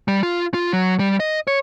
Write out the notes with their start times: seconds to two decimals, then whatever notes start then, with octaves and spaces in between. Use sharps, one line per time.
0.08 G3
0.23 F4
0.54 F4
0.73 F#3
0.99 G3
1.20 D#5
1.47 C#5